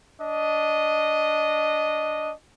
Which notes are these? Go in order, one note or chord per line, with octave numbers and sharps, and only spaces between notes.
D4 D#5